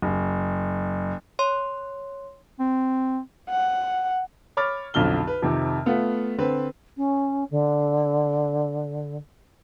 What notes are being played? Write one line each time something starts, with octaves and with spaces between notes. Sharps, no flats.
F#1
C#5 C6
C4
F#5
C#5 B5 D6 F6 A6
B1 F2 D3 F6 G7
B4
F2 C3 D#3
A3 B3 F4
D3 C4 B4
C#4
D3